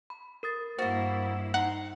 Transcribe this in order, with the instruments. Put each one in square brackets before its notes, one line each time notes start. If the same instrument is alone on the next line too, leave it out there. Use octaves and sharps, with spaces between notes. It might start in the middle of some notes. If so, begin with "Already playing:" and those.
[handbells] B5
A#4 D#6 A6
[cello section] G2 A#3 E4 [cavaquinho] F#4 D#5 [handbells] C5 A6
[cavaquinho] D#4 C6 [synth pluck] F#5